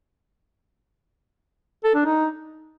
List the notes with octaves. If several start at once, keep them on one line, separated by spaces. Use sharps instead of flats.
A4
D4
D#4